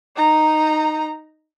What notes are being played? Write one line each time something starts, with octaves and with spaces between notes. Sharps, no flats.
D#4 A#5